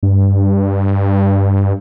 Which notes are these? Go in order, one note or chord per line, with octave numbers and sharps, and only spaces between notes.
G2